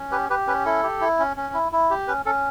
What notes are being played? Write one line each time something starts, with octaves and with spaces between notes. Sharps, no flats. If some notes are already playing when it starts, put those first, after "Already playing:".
Already playing: C#4
G4 B4
G4 B4
C#4 B4
E4 A4
G4
E4
C#4
C#4
E4
E4
G4
C#4 B4
C#4 A4